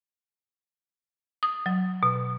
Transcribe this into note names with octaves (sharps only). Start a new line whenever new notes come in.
D#6
F#3
B2